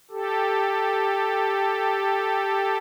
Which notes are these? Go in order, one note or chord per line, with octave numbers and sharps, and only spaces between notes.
G4 A4